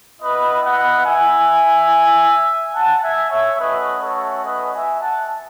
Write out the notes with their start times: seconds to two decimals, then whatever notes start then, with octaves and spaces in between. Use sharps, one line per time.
0.20 B3 E4 B4 D#5
0.62 D#5 F#5
1.05 E5 G#5
2.74 F#5 A5
3.02 E5 G#5
3.31 C#5 E5
3.59 A3 C#4 F#4 B4 D#5
4.01 A4 C#5
4.44 B4 D#5
4.72 E5 G#5
5.00 F#5 A5